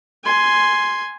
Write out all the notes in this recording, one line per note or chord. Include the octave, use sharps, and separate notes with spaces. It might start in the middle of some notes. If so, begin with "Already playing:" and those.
G#5 C6